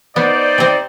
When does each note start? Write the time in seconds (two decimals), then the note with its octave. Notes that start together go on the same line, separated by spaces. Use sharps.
0.16 B3 D#4 C5 D5
0.58 C3 C4